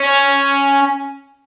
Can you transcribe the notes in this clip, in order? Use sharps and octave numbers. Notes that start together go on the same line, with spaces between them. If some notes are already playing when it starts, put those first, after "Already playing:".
Already playing: C#4